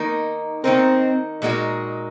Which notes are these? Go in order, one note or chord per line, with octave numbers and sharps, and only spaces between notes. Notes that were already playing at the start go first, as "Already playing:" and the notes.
Already playing: D#3 A#3 D#4 A#4
D#3 A#3 C4 D#4 A#4
A#2 G#3 D#4 F#4 A#4